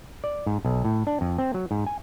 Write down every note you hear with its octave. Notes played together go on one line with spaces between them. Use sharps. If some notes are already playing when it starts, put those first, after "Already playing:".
D5
G#2
B1
A2
D4
F2
C4
F#3
G#2
G#5